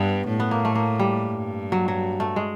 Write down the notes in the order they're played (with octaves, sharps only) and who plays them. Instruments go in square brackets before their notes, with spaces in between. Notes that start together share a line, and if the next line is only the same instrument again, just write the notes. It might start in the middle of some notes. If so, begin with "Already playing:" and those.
Already playing: [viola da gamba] G2 [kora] B3
[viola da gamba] A2
[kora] B3
A#3
A3
A#3
G3
[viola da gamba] G2
[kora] F#3
F#3
A3
G#3